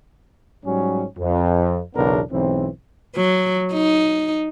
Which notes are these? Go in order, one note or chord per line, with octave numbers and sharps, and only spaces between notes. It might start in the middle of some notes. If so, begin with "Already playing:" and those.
G#2 F#3 G3 C#4
F2
B1 E2 C#3 B3 D4 A#4
B1 G#2 E3 C4
F#3
D#4